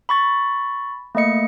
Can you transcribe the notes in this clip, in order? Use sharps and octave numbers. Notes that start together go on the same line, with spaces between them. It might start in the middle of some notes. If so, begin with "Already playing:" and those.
B5 C#6 A6
A3 A#3 D#5 C#7